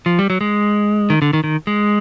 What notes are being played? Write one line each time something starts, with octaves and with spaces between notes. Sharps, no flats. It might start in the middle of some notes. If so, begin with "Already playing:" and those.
F3
G3
F#3
G#3
D#3
D3
D#3
D#3
G#3